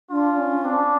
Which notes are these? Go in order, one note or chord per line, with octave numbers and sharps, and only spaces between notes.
D4 F4
C#4
C4 D4